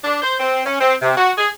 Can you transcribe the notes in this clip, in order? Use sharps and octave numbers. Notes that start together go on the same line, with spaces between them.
D4
C5
C4
C#4
C4
C3
F#4
G#4